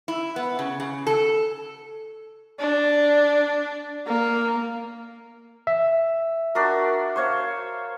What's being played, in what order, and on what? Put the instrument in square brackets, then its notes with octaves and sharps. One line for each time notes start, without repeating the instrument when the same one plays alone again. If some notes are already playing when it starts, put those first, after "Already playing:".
[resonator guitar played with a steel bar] E4
B3
C#3
C#3
A4
[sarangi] D4
A#3
[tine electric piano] E5
[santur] D4 F#4 A#4
C5 C#5 F5